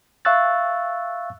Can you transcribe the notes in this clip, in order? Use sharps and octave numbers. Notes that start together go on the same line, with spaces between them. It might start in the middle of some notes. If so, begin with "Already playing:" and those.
E5 F5 C#6 E6 F#6 A6